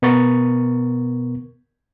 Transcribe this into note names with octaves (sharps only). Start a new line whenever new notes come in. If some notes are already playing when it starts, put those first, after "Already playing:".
B2 B3 A#4 C#6 A6